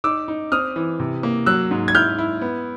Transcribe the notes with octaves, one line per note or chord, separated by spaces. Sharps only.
D#4 D6 E6
D#4
C4 D#6 F6
E3
C3
A#3
F#3 E6 F#6
G#2
G#6
E4 F6 G6
E4
B3